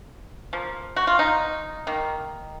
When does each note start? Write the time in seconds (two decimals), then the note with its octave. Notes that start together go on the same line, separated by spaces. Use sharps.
0.53 F3 A#3
0.96 F#4
1.07 F4
1.19 D#4
1.87 D#3 A#3